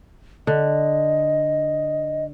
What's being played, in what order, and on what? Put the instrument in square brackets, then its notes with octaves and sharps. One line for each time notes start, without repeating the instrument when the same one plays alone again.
[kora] D3 [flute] D#5